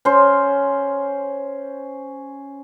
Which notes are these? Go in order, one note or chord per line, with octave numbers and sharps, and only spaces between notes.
C#4 C5